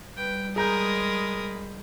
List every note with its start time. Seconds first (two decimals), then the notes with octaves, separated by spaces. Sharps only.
0.17 G3 B4 G5
0.56 G#3 G#4 A#4 A#5 B5 D#6 G6